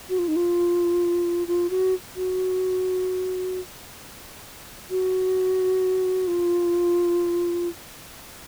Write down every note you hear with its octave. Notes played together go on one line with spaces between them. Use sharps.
F#4
F4
D#4
F4
F4
F#4
F#4
F#4
F4